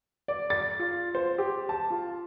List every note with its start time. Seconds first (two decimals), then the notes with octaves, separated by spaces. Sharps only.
0.28 D5
0.50 A6
0.79 F4
1.15 C5
1.38 G4
1.69 A5
1.90 F4